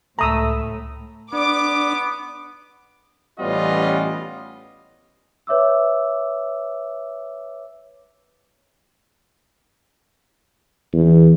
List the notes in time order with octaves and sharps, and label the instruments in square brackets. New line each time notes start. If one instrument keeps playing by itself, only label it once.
[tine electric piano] C#2 B5 [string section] A2 [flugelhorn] A3 [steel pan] A#5 D#6 E6
[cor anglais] B3 [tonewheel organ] D4 [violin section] D6
[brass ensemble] A1 G3 B3 C#4 F4 D#5
[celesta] B4 C#5 E5 D6 E6
[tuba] E2